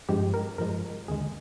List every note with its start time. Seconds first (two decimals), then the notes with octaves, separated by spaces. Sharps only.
0.09 G2 F3 G#3 G4
0.34 A#4
0.58 G2 F3 G#3 A#4
1.08 D#2 D3 G#3 G#4